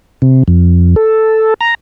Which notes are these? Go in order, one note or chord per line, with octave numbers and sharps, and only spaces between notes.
C3
F2
A4
A#5